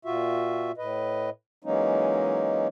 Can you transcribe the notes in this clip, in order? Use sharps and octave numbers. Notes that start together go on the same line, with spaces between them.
A#2 F4 F#4 E5
A2 B4 D#5
E3 F#3 G#3 A#3 C#4 D#4